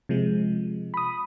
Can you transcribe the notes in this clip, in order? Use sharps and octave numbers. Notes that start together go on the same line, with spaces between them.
C3 F3 G#3
B5 D#6